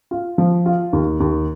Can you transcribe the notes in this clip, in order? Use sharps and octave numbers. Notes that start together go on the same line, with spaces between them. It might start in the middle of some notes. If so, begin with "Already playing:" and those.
F4
F3
F4
D#2
D#2